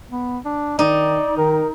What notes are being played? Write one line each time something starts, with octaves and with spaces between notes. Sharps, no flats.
B3
D4
D#3 D#4 D5
D#3 A#4